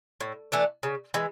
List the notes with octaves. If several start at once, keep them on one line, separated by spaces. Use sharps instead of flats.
A2
E3 A3 D4
C#3
E3 G#3